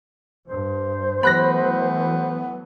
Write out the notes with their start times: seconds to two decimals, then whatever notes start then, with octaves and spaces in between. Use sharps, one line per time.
0.47 G2 C5
1.23 E3 F#3 A3 B3 B5 F#6 A#6